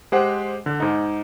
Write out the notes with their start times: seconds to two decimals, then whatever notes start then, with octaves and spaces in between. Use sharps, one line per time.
0.12 G#3 G4 C5 F#5
0.66 D3
0.80 G#2 D#4